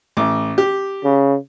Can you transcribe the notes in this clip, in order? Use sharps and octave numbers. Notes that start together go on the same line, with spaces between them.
A1 D6
G4
C#3